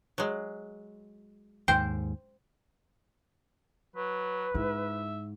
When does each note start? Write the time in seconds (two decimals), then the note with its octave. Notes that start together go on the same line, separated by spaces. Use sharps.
0.18 F#3 G#3
1.68 D#2 G#2 C5 G5
3.96 F#3 B4
4.54 G#2 E4 E5